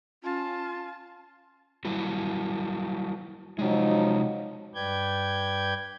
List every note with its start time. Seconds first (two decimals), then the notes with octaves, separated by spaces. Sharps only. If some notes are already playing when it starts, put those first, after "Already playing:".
0.23 C#4 F4 A5
1.85 F#3 G3 E4
3.59 C3 F3 F#3 G#3 D#4
4.75 G2 B4 D5 G5 G6 G#6